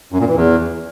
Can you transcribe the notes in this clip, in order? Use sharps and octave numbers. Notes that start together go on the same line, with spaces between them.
F#2
A#2
E3
E2